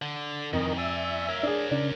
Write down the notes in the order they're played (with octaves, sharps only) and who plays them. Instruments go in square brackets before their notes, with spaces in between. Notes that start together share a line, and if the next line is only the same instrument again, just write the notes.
[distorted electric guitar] D3
[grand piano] F2 [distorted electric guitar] D#3 E3 [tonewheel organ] A#4 D#5
[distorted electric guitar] D5 G#5 [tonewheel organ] E5
[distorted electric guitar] A#4 C#5
[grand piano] D4 G#4
[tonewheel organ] C#3 [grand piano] D4